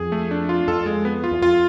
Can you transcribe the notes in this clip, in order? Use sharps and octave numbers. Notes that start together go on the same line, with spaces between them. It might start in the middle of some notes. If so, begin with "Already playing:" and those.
Already playing: F2 G#4
A3
D4
F4
F2 A4
G#3
B3
F4
E2
F2 F4